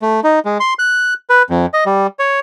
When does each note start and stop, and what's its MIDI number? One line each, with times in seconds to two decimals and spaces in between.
0.02 0.20 57
0.24 0.39 63
0.45 0.58 56
0.60 0.74 84
0.79 1.14 90
1.30 1.43 71
1.50 1.66 41
1.74 1.84 75
1.86 2.07 55
2.19 2.40 73